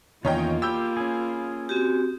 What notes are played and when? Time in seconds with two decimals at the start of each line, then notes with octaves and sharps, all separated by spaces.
0.25 E2 D#3 A#3 C#4 F4 C#5 D#5 G5
0.62 G4 B5 E6 G6
0.97 C#4 G#4
1.69 C4 F#4 G4